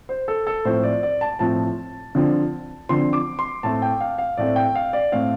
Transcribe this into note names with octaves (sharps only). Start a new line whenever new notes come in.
C5
A4
A4
A2 F3 C4 C5
D5
D5
A5
A2 F3 C4 A5
D3 F3 C4
D3 F3 C4 C6
D6
C6
A2 A3 C4 A5
G5
F5
F5
A2 A3 C4 D5
G5
F5
D5
A2 A3 C4 F5